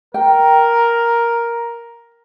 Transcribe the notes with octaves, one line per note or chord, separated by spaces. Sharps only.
A#4 G5